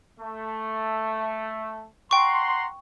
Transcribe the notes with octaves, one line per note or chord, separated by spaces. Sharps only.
A3
F#5 G5 A#5 C6 C#6